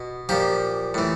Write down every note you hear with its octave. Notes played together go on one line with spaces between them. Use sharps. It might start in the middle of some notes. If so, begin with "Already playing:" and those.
Already playing: B2
A#2 F3 G4
A2 E3